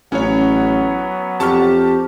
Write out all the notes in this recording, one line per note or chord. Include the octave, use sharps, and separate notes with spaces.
A1 F#3 B3 C#4 C#5
F2 G4 A5 C#6 F6